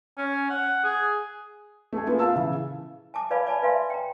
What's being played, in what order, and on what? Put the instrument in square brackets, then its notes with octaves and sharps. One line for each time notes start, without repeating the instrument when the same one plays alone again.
[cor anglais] C#4
F#5
G#4
[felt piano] A3 G#4
A#3 B3 F4
E5 F5 A5 E6
C#3 E3
[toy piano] G#5 A5 D6
B4 D5 F5 G#5 B5
D5 G#5 A5 B5
B4 E5 F5 G#5 C6
G5 A#5